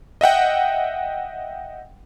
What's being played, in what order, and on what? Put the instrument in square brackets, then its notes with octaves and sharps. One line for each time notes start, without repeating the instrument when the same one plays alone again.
[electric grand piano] D#5 E5 F#5 G5